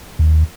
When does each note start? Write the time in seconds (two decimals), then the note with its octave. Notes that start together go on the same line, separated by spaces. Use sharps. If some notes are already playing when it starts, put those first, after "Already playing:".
0.19 D#2